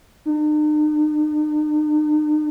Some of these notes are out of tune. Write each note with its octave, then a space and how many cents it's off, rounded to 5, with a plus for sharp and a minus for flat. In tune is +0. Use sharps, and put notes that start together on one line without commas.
D#4 -45